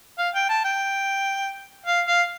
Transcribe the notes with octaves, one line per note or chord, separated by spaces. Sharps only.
F5
G5
A5
G5
F5
F5